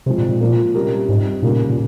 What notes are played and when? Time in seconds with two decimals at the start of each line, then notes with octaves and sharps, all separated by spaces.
0.06 C3 F3 G#3 C4
0.18 A#2
0.29 A#2
0.40 F3 A#3 F4 A#4
0.75 C3 G3 C#4 G4 A#4
1.08 G#2 G3 C4 D#4
1.42 D#2 A#2 C#3 G3 A#3
1.70 A#2